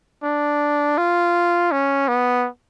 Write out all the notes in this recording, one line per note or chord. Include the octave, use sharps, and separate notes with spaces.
D4
F4
C#4
B3